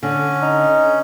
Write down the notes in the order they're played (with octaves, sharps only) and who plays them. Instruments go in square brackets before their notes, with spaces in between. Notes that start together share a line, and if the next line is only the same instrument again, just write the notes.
[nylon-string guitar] D3 [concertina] C#4
[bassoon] D#4